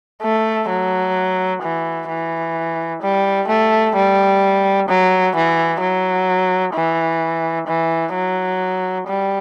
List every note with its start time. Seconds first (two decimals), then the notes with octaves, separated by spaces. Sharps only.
0.22 A3
0.70 F#3
1.63 E3
2.09 E3
3.02 G3
3.48 A3
3.96 G3
4.89 F#3
5.36 E3
5.81 F#3
6.75 E3
7.68 E3
8.14 F#3
9.07 G3